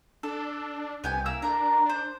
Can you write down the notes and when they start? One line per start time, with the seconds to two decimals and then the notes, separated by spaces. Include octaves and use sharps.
0.23 D4 A4
1.04 C2 B3 G5 G#5
1.26 A#3 E4 E6
1.42 D4 A#4 A#5
1.89 C5